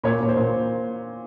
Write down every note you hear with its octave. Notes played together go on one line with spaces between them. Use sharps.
A#2 C#5
A#2
C5
A#2